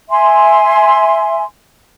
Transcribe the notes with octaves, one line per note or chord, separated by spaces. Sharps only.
E5 G#5 C6